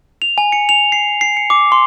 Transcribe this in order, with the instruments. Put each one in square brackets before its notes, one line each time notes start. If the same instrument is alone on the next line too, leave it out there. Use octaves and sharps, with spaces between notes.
[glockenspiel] F7
G#5
C#7
F7
C7
C7
C#7
D6
C6